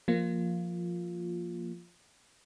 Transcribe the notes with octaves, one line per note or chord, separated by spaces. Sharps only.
F3 A#3 F4